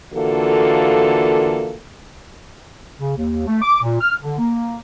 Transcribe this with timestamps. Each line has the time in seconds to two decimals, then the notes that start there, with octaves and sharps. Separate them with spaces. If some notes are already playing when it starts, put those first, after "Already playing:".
0.14 D3 E3 A#3 F4 F#4 A4
2.99 C#3
3.17 D#2
3.46 A3
3.62 D6
3.82 A#2
4.00 F6
4.21 D3
4.39 A#3